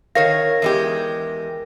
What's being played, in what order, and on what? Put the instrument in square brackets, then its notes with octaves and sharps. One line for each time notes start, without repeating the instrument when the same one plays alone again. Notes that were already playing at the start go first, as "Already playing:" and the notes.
[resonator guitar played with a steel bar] D#3 C#5 F5 [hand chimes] A#4 A#6
[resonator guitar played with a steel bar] E2 G#3 G4